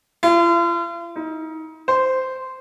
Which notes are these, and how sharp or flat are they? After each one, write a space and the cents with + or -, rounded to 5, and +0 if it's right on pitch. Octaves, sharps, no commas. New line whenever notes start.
F4 -45
D#4 +30
C5 -10